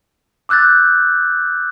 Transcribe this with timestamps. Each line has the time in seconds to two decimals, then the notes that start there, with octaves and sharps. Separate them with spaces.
0.49 D6 E6 F#6 G6 A6